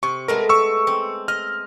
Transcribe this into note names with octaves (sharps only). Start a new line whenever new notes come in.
C3 C#6
G#3 A3 B3 A#4
C#6 E6
C4
D#5 F6